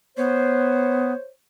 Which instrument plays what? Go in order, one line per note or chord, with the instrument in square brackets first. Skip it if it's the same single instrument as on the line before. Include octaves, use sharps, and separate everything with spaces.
[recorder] B3 [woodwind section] C5 C#5